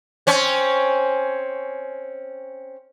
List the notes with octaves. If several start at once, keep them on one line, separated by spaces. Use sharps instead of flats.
C4 C#4